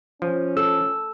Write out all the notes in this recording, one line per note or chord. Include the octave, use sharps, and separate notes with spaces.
F3 C#4
A4 E6